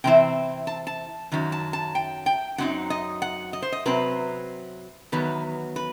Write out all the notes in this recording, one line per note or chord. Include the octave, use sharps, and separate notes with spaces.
C3 E3 C4 E4 G5
A5
A5
F#2 D#3 F#3
A5
A5
G5
G5
F#2 F#3 C4 D#4 F#5
D#5
F#5
D#5
C5
D#5
C3 F#3 C4 B4
E2 D#3 F#3 B3 B4
B4